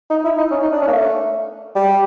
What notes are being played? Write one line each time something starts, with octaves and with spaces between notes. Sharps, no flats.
D#4
E4
D#4
C#4
D#4
D4
C#4
A#3
A3
G3